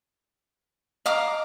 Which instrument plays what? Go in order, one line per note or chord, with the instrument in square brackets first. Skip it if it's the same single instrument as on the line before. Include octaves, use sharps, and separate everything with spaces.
[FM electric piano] D#5 [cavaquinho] F5 A#5 D6